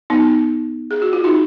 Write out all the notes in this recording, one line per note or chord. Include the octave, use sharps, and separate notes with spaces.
B3 D#4
G#4
F#4
F4
D#4 F#4